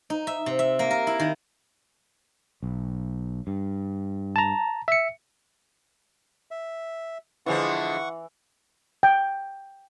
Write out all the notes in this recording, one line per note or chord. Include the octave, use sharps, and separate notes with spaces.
D#4
E5
C3
E5
A#3
A#4
E4
D#3
B1
G2
A5 A#5
E5 C#7
E5
D3 E3 F3 G#3 F#5 C#6
G5